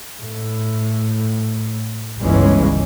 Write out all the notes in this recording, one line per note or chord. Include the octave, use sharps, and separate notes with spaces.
A2
G1 C#2 E3 G#3 C#4